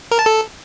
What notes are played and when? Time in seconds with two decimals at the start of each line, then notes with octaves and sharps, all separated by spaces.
0.11 A#4
0.19 A5
0.26 A4